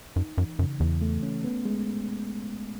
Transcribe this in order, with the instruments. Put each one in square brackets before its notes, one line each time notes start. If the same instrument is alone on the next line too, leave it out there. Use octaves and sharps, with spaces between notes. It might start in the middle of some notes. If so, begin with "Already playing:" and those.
[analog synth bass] F#2 [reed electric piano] D#4
[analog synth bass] F#2 [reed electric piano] E3
[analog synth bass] F#2 [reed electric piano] C#3
[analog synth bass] E2 [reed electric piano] E3
[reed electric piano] A3
C#4
B3
G#3